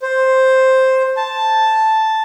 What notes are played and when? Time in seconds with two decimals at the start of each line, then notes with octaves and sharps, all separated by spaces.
0.02 C5
1.17 A5